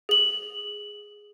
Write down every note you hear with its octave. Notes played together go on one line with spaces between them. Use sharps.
G#4 F#7